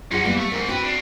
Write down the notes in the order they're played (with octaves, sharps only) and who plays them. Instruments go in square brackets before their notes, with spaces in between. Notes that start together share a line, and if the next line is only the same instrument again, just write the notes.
[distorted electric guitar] C#4 D#4 [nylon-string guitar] F4 G#4 F#5
[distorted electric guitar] E3 [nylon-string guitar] G3 A#3 B3
[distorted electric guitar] A3
[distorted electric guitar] G#2 [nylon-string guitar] A#4 G#5
[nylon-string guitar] C4 F#4 G5 [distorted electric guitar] E4 B4
[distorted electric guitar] D4 F4